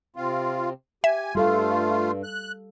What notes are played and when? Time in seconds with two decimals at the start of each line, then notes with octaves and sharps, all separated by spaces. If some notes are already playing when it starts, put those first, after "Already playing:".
0.16 C3 C4 F4
1.04 G4 E5 G#5
1.35 G2 G3 A3 F4 A4 F5
2.24 F#6